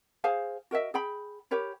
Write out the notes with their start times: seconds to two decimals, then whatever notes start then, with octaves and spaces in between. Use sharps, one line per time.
0.24 G#4 C5 F5 G#5
0.71 F#4 A#4 D#5 E5
0.94 G#4 G5 B5
1.51 G4 A#4 C#5 B5